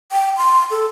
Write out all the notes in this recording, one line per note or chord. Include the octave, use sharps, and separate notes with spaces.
G5
C6
A4